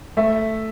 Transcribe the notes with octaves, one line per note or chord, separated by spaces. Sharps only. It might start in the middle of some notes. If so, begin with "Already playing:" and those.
A3 E5